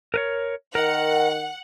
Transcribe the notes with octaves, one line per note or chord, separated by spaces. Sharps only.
A#4 B4 C#5
D#3 A#4 F#5